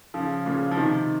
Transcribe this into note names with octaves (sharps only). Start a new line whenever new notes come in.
C#3 F3
A#2 C#3
F3
C3 D#3